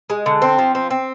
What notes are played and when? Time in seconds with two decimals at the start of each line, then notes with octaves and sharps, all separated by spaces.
0.10 G#3
0.26 D3
0.42 C4
0.59 F3
0.75 C4
0.90 C4